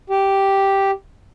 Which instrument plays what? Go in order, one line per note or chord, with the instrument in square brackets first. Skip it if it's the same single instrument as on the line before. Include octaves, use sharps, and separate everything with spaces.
[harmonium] G4